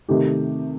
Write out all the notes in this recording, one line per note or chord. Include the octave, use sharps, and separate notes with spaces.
C3 D#3 A3 D#4 G4